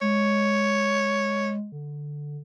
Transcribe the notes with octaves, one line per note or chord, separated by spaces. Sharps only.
G#3 C#5
D3